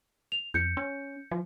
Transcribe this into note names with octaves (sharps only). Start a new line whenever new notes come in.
F7
F2 G6 C#7
C#4
F3